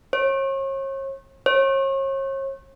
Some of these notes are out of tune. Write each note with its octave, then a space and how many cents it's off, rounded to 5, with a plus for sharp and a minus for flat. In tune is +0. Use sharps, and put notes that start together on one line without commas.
C#5 -40
C#5 -40